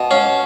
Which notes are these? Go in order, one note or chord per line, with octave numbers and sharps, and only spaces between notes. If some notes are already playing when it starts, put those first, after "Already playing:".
Already playing: B2
C#4 F5